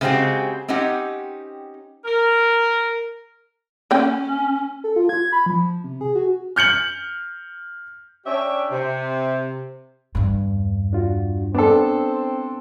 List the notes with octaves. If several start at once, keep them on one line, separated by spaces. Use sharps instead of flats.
C#3 G#3 C4 F#4 G4
C4 C#4 D#4 G4 F#5
A#4
A#3 C#4 G5
A4
F4
G#6
B5
F3
C3
G#4
F#4
F6 G6 C#7 F#7
C#4 D4 G4 E5
C3
E2 G2
D4 F4 F#4
B3 C4 D4 A4